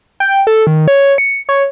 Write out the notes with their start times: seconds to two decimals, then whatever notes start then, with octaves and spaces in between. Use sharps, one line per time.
0.20 G5
0.47 A4
0.67 D#3
0.88 C#5
1.18 C#7
1.49 C#5